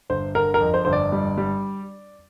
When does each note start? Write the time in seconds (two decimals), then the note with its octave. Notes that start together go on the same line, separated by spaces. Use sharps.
0.10 G1 C5
0.35 D3 A#4
0.54 A#4
0.61 F2
0.74 C5
0.85 G1 C5
0.93 D5
1.12 G3
1.38 G3